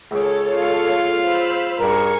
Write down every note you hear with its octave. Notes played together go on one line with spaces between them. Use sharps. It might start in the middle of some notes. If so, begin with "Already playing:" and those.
C#2 C#3 A4 C#5
F4 F5
C5 B5 E6
G2 G#4 A#4 C#6 C#7